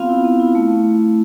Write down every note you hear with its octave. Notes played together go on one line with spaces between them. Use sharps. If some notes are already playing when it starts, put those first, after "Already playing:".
Already playing: B3 C4 F4 F5
E4
B3
E4
A3